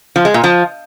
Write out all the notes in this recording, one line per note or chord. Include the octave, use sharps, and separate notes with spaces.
F3
G#3
A#2
F3